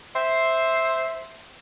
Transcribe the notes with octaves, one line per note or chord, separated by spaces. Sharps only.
C5 E5